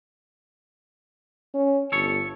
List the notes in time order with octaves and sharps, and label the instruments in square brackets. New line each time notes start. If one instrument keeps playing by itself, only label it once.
[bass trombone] C#4
[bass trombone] G1 [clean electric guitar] A4 C#5